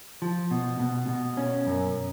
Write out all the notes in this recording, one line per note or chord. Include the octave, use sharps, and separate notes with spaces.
F3
B2
B2
B2
C#4
F#2